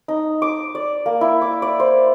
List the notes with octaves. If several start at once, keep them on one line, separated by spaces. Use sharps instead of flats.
D#4
D6
D5
A#3
E4
D6
D5
C5